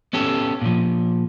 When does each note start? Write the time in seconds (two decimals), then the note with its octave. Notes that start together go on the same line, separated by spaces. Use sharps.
0.13 B3 C#4 G4 A4
0.62 A#2 F3